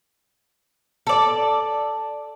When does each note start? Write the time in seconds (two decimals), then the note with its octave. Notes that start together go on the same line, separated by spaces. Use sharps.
1.07 A4 D5